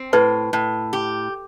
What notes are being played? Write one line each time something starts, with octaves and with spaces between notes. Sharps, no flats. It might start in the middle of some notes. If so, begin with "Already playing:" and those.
Already playing: C4
A2 B4
A2
G4